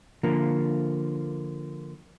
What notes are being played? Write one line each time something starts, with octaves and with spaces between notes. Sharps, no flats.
D3 F3 A#3